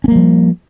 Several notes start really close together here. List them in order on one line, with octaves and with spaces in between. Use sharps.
C#4 A#3 G3 F3